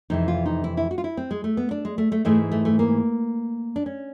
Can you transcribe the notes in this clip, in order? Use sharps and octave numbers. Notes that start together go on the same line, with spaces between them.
F2 C3 E3 D#4
F4
D#4
E4
E4
F#4
F4
E4
C4
G#3
A3
B3
D4
G#3
A3
A3
G#2 E3 G#3 A3
A3
A3
A#3
D4
C#4